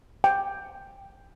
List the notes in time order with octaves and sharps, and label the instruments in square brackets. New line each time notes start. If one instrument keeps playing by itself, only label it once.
[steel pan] G5